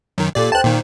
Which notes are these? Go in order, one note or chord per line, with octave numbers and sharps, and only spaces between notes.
F#2 D#3
A#2 G4 A4 D5
C5 G5 A5 F#6
A#2 D#3